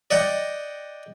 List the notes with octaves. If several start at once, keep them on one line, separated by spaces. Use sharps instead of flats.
D5 D#5 F#5 G5